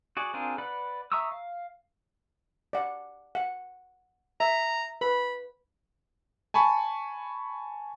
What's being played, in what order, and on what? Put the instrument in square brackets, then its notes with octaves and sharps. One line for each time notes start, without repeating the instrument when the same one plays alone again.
[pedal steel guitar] F#4 G#4 D5
C4 D4 F4 G#4 A#4
B4 D5 F#5 B5
E5 A#5 C#6 D#6 E6
F5
[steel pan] D5 F#5
F#5
[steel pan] E5 [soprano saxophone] A#5
[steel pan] B4 [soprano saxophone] B5
[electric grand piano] G#5 A5 B5 C#6